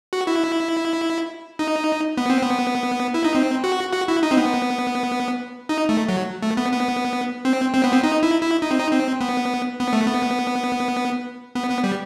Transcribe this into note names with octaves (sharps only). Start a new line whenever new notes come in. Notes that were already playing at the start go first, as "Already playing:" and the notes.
F#4
E4
D#4
B3
C4
B3
E4
D#4
C4
F#4
F#4
E4
D#4
C4
B3
D#4
A3
F#3
A3
B3
B3
C4
C4
B3
C4
D#4
E4
E4
D#4
C4
D#4
C4
B3
B3
A3
B3
B3
B3
G3